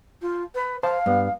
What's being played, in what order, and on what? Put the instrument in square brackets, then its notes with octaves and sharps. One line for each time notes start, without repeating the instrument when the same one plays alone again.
[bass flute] F4
B4
[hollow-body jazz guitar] C5 A5 [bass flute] F5
[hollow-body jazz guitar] G2 B3